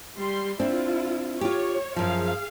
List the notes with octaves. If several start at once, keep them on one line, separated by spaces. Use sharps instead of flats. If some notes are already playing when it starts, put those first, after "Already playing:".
G3 C6
C4 D4 E4 F4
F4 G4 C#5
F#2 F3 G#4 F5